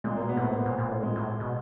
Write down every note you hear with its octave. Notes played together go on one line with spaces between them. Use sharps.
A#2 G#3
B2 A#3
B3
A2 C4
A#2 B3
A#2
A#2
A2
A#2 G#3
A2
B2